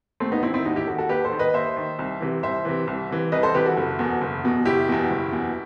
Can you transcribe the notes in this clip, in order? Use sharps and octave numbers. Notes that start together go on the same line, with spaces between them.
D#2 A3 C4
B3 D#4
D#3 C4 E4
C4 E4
D#2 D#4 F#4
E4 G4
D#3 F#4 A4
F#4 A4
D#2 G4 B4
A4 C5
D#3
B4 D#5
D#2 C5 E5
D#3
C2
C3 E3
C2 C5 E5
C3 E3
C2
C3 E3
C2 B4 D#5
A4 C5
C3 E3 G4 B4
F#4 A4
F#1
E2 B2
F#1
E2 B2
F#1 E4 G4
E2 B2
F#1
E2 B2